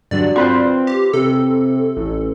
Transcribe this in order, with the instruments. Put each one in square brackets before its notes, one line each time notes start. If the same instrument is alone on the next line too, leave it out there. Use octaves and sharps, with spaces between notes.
[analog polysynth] G2 D3 F#3 [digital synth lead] D5
[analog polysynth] C4 [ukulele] F4 B4 C5
[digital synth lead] G4
[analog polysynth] C3 [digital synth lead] A4
[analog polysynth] A1